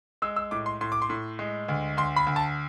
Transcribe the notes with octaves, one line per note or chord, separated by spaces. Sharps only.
G#3 E6
E6
A2 D6
C6
A2 C6
D6
C6
A2
G#3
D2
D2 C6
B5
D2
A5